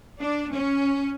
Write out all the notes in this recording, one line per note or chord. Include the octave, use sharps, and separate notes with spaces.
D4
C#4